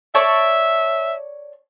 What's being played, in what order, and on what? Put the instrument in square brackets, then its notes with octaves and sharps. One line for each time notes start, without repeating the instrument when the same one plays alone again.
[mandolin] C#5 D5 A5 [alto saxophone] E5